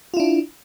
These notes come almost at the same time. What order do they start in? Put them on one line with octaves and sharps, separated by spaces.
F4 E4 D4